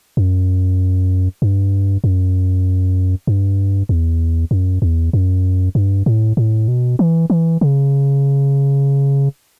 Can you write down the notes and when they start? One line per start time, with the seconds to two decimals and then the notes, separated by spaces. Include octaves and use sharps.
0.17 F#2
1.42 G2
2.04 F#2
3.27 G2
3.89 E2
4.51 F#2
4.82 E2
5.13 F#2
5.75 G2
6.06 A2
6.37 A2
6.68 B2
6.99 E3
7.30 E3
7.61 C#3